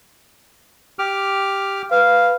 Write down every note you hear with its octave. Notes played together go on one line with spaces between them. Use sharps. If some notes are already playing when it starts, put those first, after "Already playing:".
G4 D6 F6
B4 F5